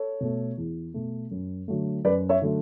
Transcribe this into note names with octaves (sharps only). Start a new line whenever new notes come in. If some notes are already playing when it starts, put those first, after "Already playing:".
Already playing: A4 C#5
B2 A3
E2
B2 A3
F#2
D3 F#3 A3
F#2 B4 D5
C#5 E5
D3 F#3 A3